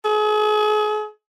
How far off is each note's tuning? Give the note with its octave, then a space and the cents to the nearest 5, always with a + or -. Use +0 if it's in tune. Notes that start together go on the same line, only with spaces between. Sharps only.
G#4 +35